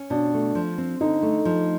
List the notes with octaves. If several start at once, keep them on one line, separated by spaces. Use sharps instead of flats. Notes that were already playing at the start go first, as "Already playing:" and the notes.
Already playing: C#4
B2 D4
A3
F3
C4
D3 D#4
A3
F3